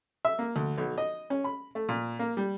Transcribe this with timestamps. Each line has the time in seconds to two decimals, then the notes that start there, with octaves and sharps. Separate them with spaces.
0.25 E5
0.39 A#3
0.56 D2
0.78 B1
0.98 D#5
1.30 C#4
1.44 B5
1.75 A3
1.89 A#2
2.19 A#3
2.37 G3